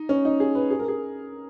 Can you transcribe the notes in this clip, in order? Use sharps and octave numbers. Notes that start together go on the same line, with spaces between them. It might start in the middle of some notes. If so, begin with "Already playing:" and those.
Already playing: D#4
C#4
D#4
G#4
B4
G#4
A#4
G#4